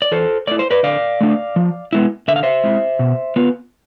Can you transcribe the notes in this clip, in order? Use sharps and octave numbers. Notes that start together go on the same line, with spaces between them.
D5
E3 A4 C5
A3 E4 D5
C5
B4 D5
D3 D5 F5
A3 D4
F3
G#3 B3 E4
D3 E5
F5
C5 E5
G#3 C4 E4
B2
B3 F4